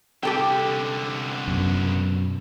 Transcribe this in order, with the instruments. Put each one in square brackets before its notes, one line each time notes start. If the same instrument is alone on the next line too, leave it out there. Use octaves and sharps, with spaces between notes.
[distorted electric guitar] C2 D3 [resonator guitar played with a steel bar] G4 A4 G5
[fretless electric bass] F#2 B2